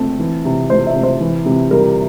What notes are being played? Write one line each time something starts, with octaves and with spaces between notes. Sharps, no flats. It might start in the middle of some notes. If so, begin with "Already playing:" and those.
Already playing: A3 C4 A5
E3
C3
A3 C5
E5
C3
C5
E3
C3
G3 A#4